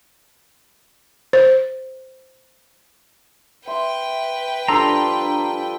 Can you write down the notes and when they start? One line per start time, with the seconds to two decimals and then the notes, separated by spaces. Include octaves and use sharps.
1.33 C5
3.68 B4 E5 G5 C6
4.68 F3 G3 D4 A4 A#5 C6